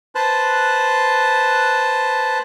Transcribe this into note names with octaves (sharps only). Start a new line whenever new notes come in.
B4 C5 A5 F#6